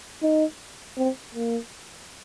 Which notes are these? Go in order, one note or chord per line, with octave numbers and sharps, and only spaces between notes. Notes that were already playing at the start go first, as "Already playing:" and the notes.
D#4
C4
A#3